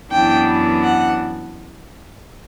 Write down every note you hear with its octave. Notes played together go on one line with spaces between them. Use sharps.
F#2 E3 B3 D4 G5
F#5